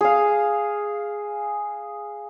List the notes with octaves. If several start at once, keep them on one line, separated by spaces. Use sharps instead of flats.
G#4 F5